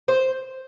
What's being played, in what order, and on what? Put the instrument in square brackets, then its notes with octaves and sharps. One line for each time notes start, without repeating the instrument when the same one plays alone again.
[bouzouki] C5